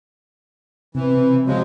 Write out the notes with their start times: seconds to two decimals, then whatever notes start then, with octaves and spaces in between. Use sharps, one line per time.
0.95 C3 E3 C4
1.09 C4
1.47 F3 F#3 G#3 F#4